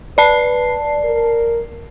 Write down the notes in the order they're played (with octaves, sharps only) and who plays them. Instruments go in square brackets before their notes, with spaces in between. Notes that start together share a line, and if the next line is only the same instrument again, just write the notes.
[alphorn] B4 [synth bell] D5 A5 C7
[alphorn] A#4